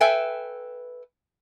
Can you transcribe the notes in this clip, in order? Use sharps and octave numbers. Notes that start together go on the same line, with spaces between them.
A4 B4 E5 G5 G#5